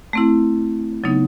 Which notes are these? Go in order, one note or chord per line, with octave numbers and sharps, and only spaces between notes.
A3 C4 E4
C#3 F#3 B3 D#4